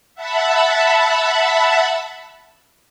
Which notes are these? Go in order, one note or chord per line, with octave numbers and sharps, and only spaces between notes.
E5 F#5 A5 B5